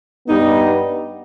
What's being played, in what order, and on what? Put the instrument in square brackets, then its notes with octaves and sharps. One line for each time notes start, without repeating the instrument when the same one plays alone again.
[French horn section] G2 G3 B3 [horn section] D#4